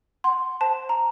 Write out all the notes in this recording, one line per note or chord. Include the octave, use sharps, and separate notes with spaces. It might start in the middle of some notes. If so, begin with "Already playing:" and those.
F#5 C6
C5 A5
A#5